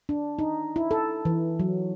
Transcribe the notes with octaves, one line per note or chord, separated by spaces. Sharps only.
D4
D#4
E4
A4
E3
F#3